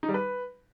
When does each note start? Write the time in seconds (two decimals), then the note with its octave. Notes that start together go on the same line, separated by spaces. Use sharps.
0.03 D#4
0.09 G3
0.14 B4